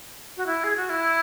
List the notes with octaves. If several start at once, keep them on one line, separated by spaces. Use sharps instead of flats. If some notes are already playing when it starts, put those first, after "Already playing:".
F#4
E4
G#4
F#4
E4